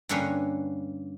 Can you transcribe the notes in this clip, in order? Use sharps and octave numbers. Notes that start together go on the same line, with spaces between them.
G2 D3 A#3 C#4 B4